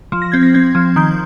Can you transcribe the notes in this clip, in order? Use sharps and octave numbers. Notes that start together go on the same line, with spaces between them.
F3
A#6
C4 G#6
A#6
C4 G#6
F3
D#3 G6